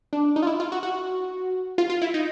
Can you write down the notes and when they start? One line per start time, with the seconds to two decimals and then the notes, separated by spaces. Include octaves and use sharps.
0.13 D4
0.36 D#4
0.43 F4
0.47 E4
0.60 F4
0.72 F#4
0.83 F#4
1.78 F4
1.90 F4
2.02 E4
2.14 D#4